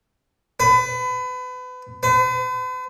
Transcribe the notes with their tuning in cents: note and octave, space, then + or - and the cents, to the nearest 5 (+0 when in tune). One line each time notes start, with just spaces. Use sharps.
B4 +30
B4 +45